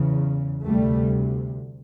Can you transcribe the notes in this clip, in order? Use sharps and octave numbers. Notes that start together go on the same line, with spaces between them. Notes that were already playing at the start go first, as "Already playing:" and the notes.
Already playing: E2 C#3
D2 C3 G3 A3